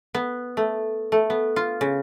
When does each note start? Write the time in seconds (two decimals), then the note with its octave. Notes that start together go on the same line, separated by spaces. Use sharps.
0.15 B3
0.57 A3
1.12 A3
1.30 B3
1.56 F4
1.81 C#3